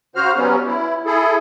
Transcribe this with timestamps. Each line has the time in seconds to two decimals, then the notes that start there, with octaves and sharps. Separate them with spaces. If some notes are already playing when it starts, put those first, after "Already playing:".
0.15 C#3 F#4 C5 F6
0.37 F#3 G3 B3 C#4
0.66 E4
1.06 E4 G#4 A4